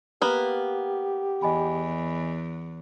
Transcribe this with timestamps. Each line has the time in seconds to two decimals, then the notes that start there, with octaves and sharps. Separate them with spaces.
0.22 A#3 B3 G4
1.42 E2 D#5 G#5 B5